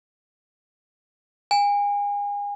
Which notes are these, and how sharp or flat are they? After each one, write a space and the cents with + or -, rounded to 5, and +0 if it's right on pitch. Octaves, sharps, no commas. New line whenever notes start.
G#5 -35